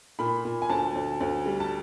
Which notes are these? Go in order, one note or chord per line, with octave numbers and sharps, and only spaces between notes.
A#2 B5
A#2
G#5
D2 A5
D2
D2
G3
A5